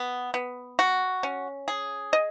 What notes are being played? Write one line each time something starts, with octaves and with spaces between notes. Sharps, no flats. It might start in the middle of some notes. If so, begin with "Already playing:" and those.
Already playing: B3
B3
F#4
C#4
G#4
D#5